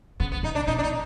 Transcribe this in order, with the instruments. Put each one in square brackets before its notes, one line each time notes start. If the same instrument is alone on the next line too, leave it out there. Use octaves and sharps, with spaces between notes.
[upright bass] C#3 [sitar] B3
[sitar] B3
[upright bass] C3 [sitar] D#4
[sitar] D4
[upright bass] B2 [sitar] D#4
[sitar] D4
D#4